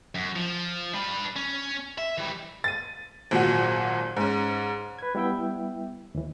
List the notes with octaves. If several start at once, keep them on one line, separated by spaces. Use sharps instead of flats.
F#2
F3
D4 B4
C#4
E5
E3 G3
A6 D#7
G#1 A#2 F#3 F#5
G#2 C#4
B4 G#6
G3 B3 E4 E5 G5
D#2 E3